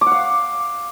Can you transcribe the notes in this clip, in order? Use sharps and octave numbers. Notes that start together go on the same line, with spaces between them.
D6
F#5
F5